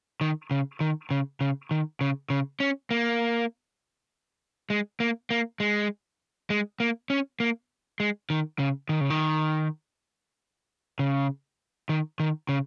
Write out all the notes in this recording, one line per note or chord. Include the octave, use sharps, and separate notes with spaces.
D#3
C#3
D#3
C#3
C#3
D#3
C#3
C#3
C#4
A#3
G#3
A#3
A#3
G#3
G#3
A#3
C#4
A#3
G#3
D#3
C#3
D#3
C#3
D#3
C#3
D#3
D#3
C#3